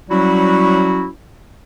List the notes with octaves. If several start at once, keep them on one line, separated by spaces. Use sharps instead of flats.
F#3 G3 C#4 E4 F#4